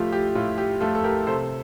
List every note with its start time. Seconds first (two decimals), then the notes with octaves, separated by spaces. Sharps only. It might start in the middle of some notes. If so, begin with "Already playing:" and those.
Already playing: A2 F3 A3 F4 G4
0.12 G4
0.35 A2 F4
0.58 G4
0.80 F3 A3 F4 A4
0.95 A4
1.04 G4 A#4
1.27 C3 A4 C5